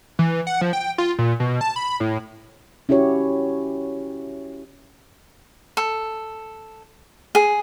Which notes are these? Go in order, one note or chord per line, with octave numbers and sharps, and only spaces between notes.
E3
F#5
F3
G5
F4
A#2
B2
A5
B5
A2
C#4 E4 F#4 G4 C#5
A4
G#4